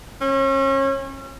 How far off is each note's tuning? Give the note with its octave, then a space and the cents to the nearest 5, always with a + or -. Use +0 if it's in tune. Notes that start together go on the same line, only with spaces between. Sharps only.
C#4 -35